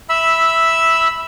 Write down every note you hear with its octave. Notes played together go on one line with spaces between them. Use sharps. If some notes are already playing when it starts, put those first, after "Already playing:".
E5 B5 E6